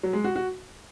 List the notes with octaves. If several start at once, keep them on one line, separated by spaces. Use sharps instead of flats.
F#3
G#3
F#4
F#4